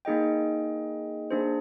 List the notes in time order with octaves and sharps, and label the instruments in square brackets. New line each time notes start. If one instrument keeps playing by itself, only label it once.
[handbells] A#3 D#4 G#4 D#5 G5
A#3 D4 G#4 C5